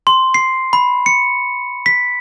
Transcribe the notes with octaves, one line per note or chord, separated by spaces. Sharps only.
C6
C7
B5
C#7
B6